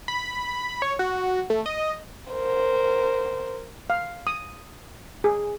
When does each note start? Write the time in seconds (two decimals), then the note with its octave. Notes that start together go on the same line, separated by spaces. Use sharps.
0.08 B5
0.82 C#5
0.99 F#4
1.50 A3
1.66 D#5
2.33 A#4 C5
3.90 F5
4.27 D#6
5.24 G#4